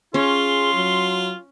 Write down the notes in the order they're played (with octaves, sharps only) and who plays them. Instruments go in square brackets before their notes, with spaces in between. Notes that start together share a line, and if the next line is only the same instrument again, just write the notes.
[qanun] C#4 [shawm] F4 [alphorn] G#4 [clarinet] C6
[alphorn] F#3